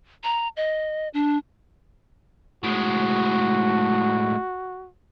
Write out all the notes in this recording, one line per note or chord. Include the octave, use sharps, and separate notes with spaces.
A#5
D#5
D4
A2 G#3 F#4